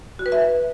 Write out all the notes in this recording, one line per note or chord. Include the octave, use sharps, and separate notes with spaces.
F#4
B4
E5